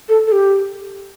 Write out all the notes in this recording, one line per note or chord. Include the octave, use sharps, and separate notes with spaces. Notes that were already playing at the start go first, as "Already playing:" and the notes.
A4
A4
G4